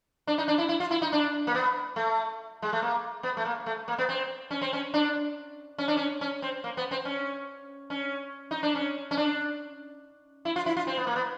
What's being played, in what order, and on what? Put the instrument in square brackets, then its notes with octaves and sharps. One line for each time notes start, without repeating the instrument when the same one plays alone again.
[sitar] D4
D#4
D4
E4
E4
F4
E4
D#4
D4
A#3
B3
A3
G#3
A3
A#3
B3
A3
A#3
A3
A#3
B3
C4
C#4
C4
C#4
D4
C#4
D4
C#4
C#4
C4
A#3
B3
C4
C#4
C#4
D#4
D4
C#4
C#4
D4
E4
F4
E4
F4
C4
B3
A#3
B3